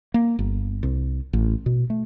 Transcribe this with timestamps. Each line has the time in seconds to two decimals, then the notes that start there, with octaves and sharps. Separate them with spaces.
0.14 A#3
0.39 G1
0.83 C2
1.33 A1
1.66 B2
1.90 A3